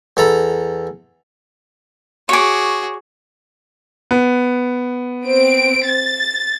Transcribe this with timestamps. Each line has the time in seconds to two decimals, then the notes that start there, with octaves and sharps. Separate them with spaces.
0.17 E2 A4 A#5 B5
2.29 F#4 G#4 C#5 D6
4.11 B3
5.24 C4 D7
5.87 A6